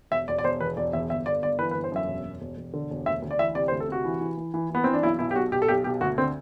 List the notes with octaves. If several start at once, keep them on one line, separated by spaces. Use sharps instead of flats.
E1 E5
E1 D5
D5
E1 C5
E2 B4
E1 D5
E2 E5
G1 E5
G1 D5
G1 D5
E3 B4
B4
G1
C5
F#2 E5
E1
E1
E1
E1
D3
E1
D2 E5
D2
D5
E3 E5
C3 D5
C5
D2
A4
C3 F#4
E3
E3
E3
E3
E3 B3
E3 C4
D4
B1 E4
B2 E4
G4
B1 F#4
B2 G4
A4
B1 G4
B2 G4
D2 F#4
D3 C4